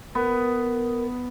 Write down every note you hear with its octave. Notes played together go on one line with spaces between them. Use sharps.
B3 A#4